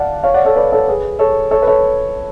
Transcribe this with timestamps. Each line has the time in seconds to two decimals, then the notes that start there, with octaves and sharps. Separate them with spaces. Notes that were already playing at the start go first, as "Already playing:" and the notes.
Already playing: D5 F5 F#5 A5
0.23 C#5 F5
0.34 D5 F#5
0.45 A4 C#5
0.56 B4 D5
0.72 A4 C#5
0.88 G#4 B4
1.19 A4 C#5
1.51 A4 C#5
1.62 B4
1.67 A4 C#5